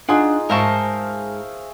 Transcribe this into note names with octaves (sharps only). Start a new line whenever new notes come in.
D4 D#4 F4 G#4 F#5
G#2 A#4 C5 E5 F5 A5 C#6